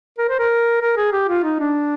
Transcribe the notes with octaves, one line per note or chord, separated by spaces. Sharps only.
A#4
C5
A#4
A#4
G#4
G4
F4
D#4
D4